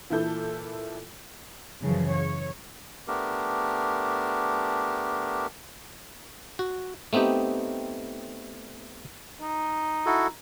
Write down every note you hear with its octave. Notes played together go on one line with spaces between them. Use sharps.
A#2 E3 E4 A4 G6
F#2 C#3 E3 F3
C#5
A3 B3 D4 G4 A#4
F#4
A3 B3 C4 D#4 G4
D#4
E4 F#4 A4